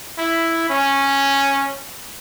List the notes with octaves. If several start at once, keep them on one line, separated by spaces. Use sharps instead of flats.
E4
C#4